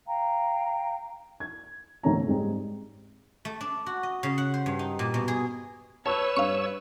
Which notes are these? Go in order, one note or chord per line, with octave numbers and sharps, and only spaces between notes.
F5 G5 A#5
G#6
G#1 C#2 A3 C4 C#5 A#5
G#2 G3 G#3 C4
A3
D4
F#4
D#5
C#3
F#5
C5
G2
D#4
A#2
B2
G#4
B4 C#5 A5 C#6 E6
G2 F5 C#6